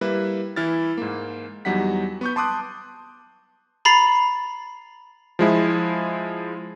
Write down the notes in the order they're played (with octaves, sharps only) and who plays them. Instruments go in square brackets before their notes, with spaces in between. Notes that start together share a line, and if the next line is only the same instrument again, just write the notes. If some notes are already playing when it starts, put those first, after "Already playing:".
[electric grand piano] G3 A#3 E4 B4 E5
E3 E4 F6 A6
G#2 A#3
E2 F#3 G3 D#4 F#5 B6
B3 C#6 G6
A5 C6 D6 D#6 F#6
[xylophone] A#5 B5 A6 C7
[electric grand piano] F3 G#3 E4